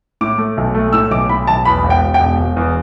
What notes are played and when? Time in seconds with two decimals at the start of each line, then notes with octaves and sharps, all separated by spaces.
0.21 A2 D6
0.38 A3
0.57 B1
0.75 A3
0.93 A2 E6
1.11 B1 D6
1.29 A2 B5
1.47 B1 A5
1.65 E2 B5
1.84 E1
1.90 G5
2.02 E1
2.14 G5
2.20 E1
2.39 E1
2.57 E2